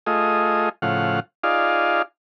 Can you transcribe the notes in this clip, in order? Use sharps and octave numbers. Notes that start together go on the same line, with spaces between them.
A3 F4 G#4 D#5
A2 C#3 F3 F5 F#5
D#4 F4 G#4 D5 F5